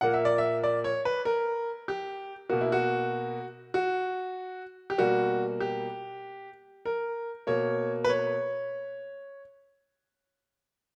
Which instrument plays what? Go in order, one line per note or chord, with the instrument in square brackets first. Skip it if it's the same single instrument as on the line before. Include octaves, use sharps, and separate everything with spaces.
[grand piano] A#2 A#3 F#5
E5
D5
E5
D5
C#5
B4
A#4
G4
B2 A#3 F#4
E4
F#4
F#4
G4
B2 G3 A#3 F#4
G4
A#4
B2 A#3 C#5
B4
C#5